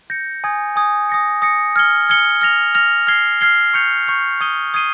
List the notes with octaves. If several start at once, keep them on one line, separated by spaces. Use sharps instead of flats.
G6 A#6 C#7
G#5 D#6 G#6
G#5 D#6 G#6
D#6 A#6 C#7
D#6 A#6 C#7
F6 G#6 C#7 G7
F6 G#6 C#7 G7
F6 A#6 F7
F6 A#6 F7
F6 G#6 C7 G7
F6 G#6 C7 G7
C#6 G6 C#7 F7
C#6 G6 C#7 F7
D#6 G#6 C7 D#7 G7
D#6 G#6 C7 D#7 G7